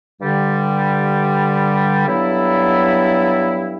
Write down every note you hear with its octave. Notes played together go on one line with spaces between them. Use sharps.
G2 D3 G3
G2 F#3 B3 E4 A4